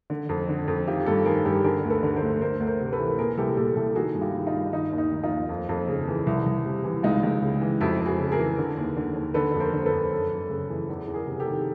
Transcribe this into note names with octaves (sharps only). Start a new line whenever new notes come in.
D3
F2
D3
F2
D#3 F4 G4
G2 G4 A4
D#3 G#4 A#4
G2 G4 A4
D3 G#4 A#4
D2
A4 B4
D3
A#4 C5
D2
D2 A#4 C5
D2
A#4 C5
C3
A4 B4
E3
A#2 G#4 A#4
C2 G4 A4
A#2 G4 A4
C2 G4 A4
D#3 F#4 G#4
G2
F4 G4
D#3
D#4 F4
G2
D#3 D#4
D#2
D#4
D#3
D#4 F4
D#2
F2
F2
C#3
E3
C2
C2
C3
E3
C#2 D#4 F4
C#2
C#3
E3
F2 E4 F#4
F2
F#4 G#4
C#3
G#4 A#4
E3
D3
D#2
D3
D#2
D3 A4 B4
F2
A#4 C5
D3
A4 B4
F2
F#2
F#2
C#3
E3
E2
E2
G#4 A#4
C3
G4 A4
D#3